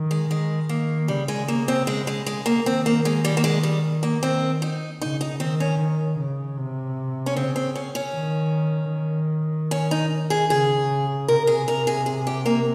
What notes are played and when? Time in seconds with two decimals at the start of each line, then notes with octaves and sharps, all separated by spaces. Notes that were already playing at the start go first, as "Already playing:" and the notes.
Already playing: D#3
0.11 G#3
0.30 D#3 G#3
0.69 D#3 A#3
1.08 C#3 G3
1.28 G#3
1.48 A#3
1.68 C4
1.87 G#3
2.07 G#3
2.26 G#3
2.46 A#3
2.66 D#3 C4
2.86 A#3
3.05 G#3
3.25 G3
3.37 A#3
3.44 G#3
3.63 G3
4.03 A#3
4.23 D#3 C4
4.62 D#4
5.01 C#3 D#4
5.21 D#4
5.40 D#3 C4
5.60 C#4
5.79 D#3
6.19 C#3
6.58 C3
7.26 C#4
7.36 C#3 C4
7.56 C4
7.76 C#4
7.95 C#4
8.15 D#3
8.94 D#3
9.71 C#4
9.91 D#4
10.30 G#4
10.50 C#3 G#4
11.28 C3 A#4
11.47 G#4
11.68 A#4
11.87 G#4
12.06 G#4
12.27 G4
12.46 A#3